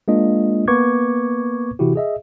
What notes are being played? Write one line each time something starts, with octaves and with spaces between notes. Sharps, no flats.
G#3 A#3 D4 F4 D#5
A#3 B3 B4 C#6 D6 G#6
C3 E3 E4 F#4 G4
G#4 D#5 E5